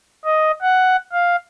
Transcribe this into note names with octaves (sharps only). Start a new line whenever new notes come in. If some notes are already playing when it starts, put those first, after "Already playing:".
D#5
F#5
F5